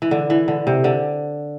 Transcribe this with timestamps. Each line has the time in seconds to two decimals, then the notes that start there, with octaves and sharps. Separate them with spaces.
0.02 E3
0.11 D3
0.30 E3
0.48 D3
0.67 C3
0.84 D3